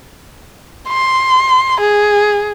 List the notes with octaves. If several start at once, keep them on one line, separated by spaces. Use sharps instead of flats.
C6
G#4